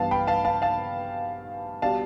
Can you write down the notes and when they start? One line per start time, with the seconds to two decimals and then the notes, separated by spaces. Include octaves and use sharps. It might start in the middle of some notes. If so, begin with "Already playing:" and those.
Already playing: G2 E3 B3 F5 A5
0.11 G5 B5
0.27 F5 A5
0.45 F5 A5
0.62 F5 A5
1.82 B2 G3 D4 F5 A5